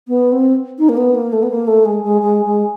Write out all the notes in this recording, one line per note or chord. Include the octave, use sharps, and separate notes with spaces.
B3
C4
D#4
A#3
B3
A#3
A3
B3
A#3
A3
G#3
G#3
G#3
G#3